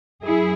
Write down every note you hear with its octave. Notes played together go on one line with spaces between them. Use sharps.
F#2 E4 G#4